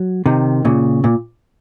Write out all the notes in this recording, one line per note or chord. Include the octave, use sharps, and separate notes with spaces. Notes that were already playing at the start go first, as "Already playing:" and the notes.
Already playing: F#3
C3 D#3
A#2 C#3
A#2